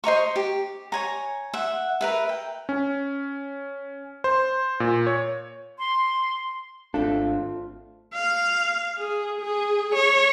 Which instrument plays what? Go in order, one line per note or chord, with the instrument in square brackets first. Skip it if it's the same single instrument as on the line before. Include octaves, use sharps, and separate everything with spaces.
[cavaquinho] C5 D#5 A#5 C#6
G4
C#5 G#5 A#5
E5 F#5
A#4 B4 E5
G5
[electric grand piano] C#4
C5
A#2
C#5
[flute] C6
[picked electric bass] G#1 D4 [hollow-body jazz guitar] A3 C4 A4 [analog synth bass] F4
[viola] F5
G#4
G#4
C#5